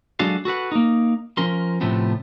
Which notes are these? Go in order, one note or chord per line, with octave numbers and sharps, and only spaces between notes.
F#3 G#3 D4 F#4 A4 F5
F#4 A4 B4 F#5
A#3 D#4
F3 C#4 A#4 C6
A2 C3 F3 A3 B3